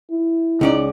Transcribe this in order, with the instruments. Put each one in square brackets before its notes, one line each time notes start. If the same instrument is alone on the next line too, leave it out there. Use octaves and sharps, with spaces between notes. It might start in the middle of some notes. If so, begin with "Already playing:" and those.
[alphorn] E4
[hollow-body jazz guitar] C#2 C#4 D5 [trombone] D#4